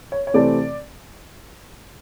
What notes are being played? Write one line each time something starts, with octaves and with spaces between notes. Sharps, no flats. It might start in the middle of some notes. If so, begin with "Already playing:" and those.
C#5
C#5
C3 E3 A3 C4 D5